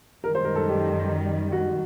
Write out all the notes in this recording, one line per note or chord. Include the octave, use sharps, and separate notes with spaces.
F#2 D#3 G3 A#4
C5
A#4
A4
G4
F#4